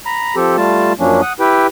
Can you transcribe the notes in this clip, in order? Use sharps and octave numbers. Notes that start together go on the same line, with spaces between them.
A#5 B5
F3 C4 G4 A4
G3 A3 F4 A5
F#2 F3 F#3 A#3 C#4 D4
F#5 D#6
E4 G4 B4 G5